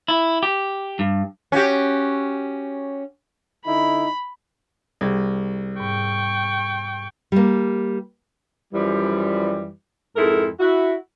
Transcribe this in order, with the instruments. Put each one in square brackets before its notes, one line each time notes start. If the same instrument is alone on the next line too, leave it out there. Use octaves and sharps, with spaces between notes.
[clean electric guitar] E4
G4
G2
[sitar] C#4 F#4 G4
[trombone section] D3 D#4 E4 [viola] B5
[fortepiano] C2 [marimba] G3 G4 G#4
[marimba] G#2 [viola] G5 C#6
[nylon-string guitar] G3 A#3
[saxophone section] F#2 E3 F3 G3
F2 G#2 G#3 E4 A4 A#4
E4 F#4